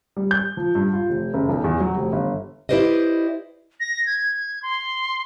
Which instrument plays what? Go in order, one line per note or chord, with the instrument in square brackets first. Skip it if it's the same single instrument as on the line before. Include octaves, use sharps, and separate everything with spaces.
[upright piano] G3
G6
F3
G2
F4
F1
F#1
B1
E2
F#3
F1
G1
[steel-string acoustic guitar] E4 G4 B4 C5 D5 D#5
[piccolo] A#6
G#6
C6